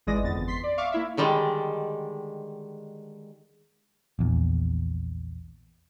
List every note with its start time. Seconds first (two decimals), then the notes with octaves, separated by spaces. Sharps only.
0.07 G#1 E3 G#3 D5 D#6 A#6
0.23 G1 F2 B3 A6
0.47 C6 B6 C7
0.63 D5
0.77 E5 F5 C#6 D6
0.92 A#3 E4 E5
1.17 D3 D#3 G3 G#3
4.19 A#1 E2